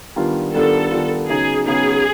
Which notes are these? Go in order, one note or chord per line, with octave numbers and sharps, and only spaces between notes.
D#3 G3 B3 D4 F4
D#3 G3 B3 D4 F4 A4
D#3 G3 B3 D4 F4
C#3 F#3 B3 D#4 G#4
C#3 F#3 B3 D#4 G#4